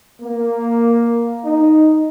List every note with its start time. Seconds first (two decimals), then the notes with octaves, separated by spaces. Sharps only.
0.22 A#3
1.45 D#4